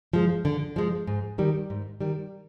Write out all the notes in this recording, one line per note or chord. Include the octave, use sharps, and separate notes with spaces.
F3 G#3
D3
F3 G#3
G#2
D#3 G3
G#2
D#3 G3